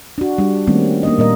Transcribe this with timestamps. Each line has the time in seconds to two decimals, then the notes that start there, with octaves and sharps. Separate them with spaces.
0.18 D4 F#4
0.38 G3 D4
0.67 D#3 G3 A3 A#3 C4 C#4
1.03 A#3 D4 D#5
1.18 A#2 G3 A#4 D#5